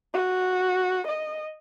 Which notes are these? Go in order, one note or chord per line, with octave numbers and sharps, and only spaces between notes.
F#4
D#5